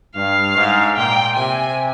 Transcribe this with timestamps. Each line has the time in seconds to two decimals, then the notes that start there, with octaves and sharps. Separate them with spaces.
0.15 G2 F5
0.55 G#2
0.96 A#2 G5
1.36 C3 G#5